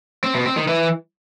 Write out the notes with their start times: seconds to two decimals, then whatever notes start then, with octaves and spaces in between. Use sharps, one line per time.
0.24 C4
0.35 B2
0.46 C4
0.57 D#3
0.68 E3